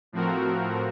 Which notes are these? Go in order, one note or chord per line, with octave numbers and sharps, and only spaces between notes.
A2 F3 C4 F#4 A#4